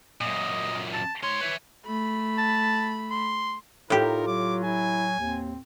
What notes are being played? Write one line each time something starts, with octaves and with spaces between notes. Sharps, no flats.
F#2 A#2 D#5
A5
G#2 C#5 C6
B4 E5
A3 B5
A5
C6
A2 D#4 F4 G4 A#4
F#3 D6
E4 G#5
D#2 C4